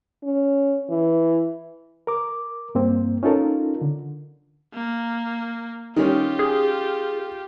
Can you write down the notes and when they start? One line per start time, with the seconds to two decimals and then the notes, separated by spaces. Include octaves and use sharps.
0.23 C#4
0.90 E3
2.07 A#4 D6
2.75 G2 A#3 C4
3.23 C#4 D#4 F4 A4 A#4
3.81 D3
4.74 A#3
5.96 D#3 G3 C#4 F4 G4
6.39 G#4